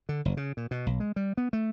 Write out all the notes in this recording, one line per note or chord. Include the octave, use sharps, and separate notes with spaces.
D3
F#1
C#3
A#2
B2
B1
G#3
G3
B3
A3